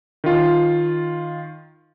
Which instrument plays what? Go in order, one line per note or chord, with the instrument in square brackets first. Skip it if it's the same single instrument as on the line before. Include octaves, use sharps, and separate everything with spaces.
[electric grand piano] D#3 F4